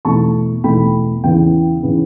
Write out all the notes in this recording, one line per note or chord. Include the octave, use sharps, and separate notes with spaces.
E2 B2 A3 A5 C#6
E2 B2 A3 G5 B5
E2 C#3 E3 B3 G5
C#3 E3 B3